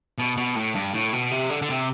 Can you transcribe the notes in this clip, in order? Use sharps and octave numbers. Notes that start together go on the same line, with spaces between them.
B2
B2
A2
G2
A2
B2
C3
D3
D3
C3